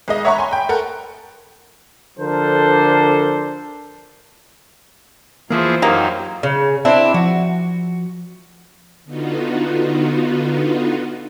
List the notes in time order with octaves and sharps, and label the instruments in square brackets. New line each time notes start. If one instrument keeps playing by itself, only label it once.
[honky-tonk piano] B1 G#3 D#5
C#5 E5 F#5 A#5 B5 C#6
G#5 C6
G5 B5
A4 A#4 F#5
[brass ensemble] D3 F3 D4 A4 A#4 C5
[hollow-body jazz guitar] E2 E3 A#3 [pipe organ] F3 E4 G#4 [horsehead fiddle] F4 C5
[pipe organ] F#2 F#3 D#4 [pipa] D#3 A#3 [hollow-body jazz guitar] G4 A#4 F5
[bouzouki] C#3
C4 D4 E4
[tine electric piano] F3 [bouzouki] F#4
[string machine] D3 B3 D#4 F4 F#4